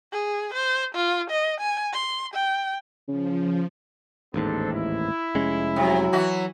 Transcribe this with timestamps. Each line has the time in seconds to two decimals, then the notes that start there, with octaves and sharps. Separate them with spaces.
0.12 G#4
0.54 C5
0.95 F4
1.30 D#5
1.60 G#5
1.93 C6
2.34 G5
3.08 C#3 F3
4.34 A1 D#2 G#2 C4 D4 A4
4.72 E4
5.35 F1 G#3 C#4
5.76 C3 F#3
6.13 E3 F#4